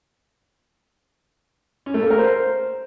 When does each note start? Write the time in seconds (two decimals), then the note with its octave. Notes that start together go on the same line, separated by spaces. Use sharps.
1.86 C#4
1.94 A3
2.02 A#3
2.10 A#4
2.18 C5